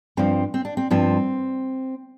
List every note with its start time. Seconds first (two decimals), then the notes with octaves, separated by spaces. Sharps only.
0.17 G2 F3 C4
0.54 C4
0.65 D4
0.77 C4
0.91 G2 F3 C4